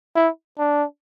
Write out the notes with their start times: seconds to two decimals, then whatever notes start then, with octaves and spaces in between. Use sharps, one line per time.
0.16 E4
0.58 D4